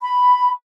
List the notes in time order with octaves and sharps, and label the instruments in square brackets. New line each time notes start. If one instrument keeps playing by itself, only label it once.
[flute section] B5